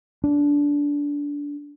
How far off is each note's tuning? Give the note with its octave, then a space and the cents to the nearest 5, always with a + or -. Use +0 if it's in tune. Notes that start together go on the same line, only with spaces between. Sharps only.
D4 -20